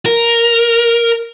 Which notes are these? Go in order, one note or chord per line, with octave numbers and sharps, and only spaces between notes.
A#4